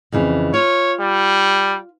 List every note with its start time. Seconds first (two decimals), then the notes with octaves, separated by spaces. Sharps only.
0.12 F2 C#3 E3
0.54 F4 C#5
1.00 G3